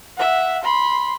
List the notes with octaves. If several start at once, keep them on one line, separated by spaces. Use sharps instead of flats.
E5 F#5
B5 C6